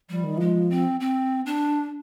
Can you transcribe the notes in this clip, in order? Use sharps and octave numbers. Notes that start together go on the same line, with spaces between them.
F3 G3
D#3
F3 G#3
C4
C4
D4